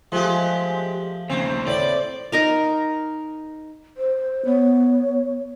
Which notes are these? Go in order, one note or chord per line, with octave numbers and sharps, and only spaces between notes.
F3 G#3 A3 G4
D#2 C#3 C4
A2 D5 B5
D#4 A#4 F5
C5
B3 C#5